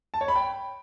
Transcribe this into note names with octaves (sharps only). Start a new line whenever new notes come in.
A5
C#5
B5
G5